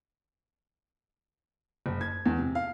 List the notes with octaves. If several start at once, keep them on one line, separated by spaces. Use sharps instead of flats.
F#1
G#6
E2
C3
F5